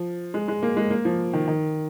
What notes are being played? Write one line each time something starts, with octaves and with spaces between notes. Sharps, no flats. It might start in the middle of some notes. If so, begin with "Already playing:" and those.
Already playing: F3
G#3
G#3
A#3
G#3
A#3
F3
D#3
D#3